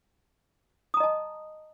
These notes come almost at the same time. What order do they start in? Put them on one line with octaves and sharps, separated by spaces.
D#6 A#5 D#5 A5